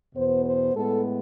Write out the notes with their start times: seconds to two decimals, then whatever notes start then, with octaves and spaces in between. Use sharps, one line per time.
0.14 E2 B2 B3 C5
0.44 C5
0.74 A2 G#3 B3 A4